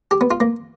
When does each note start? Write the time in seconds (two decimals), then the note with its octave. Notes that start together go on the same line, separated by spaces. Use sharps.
0.11 G4
0.21 B3
0.31 F4
0.40 A#3